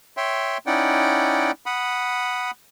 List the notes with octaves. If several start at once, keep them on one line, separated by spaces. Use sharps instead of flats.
C#5 E5 G5 C6
C#4 D#4 E4 D5 F#5 G5
F#5 B5 D#6